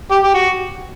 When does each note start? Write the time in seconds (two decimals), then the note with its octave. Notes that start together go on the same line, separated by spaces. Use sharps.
0.11 G4
0.23 G4
0.34 F#4